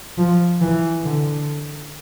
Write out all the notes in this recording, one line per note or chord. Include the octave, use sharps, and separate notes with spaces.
F3
E3
D3